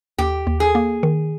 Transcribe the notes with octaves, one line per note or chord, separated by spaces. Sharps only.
D#2 G4
D#2
G#4
A#3
D#3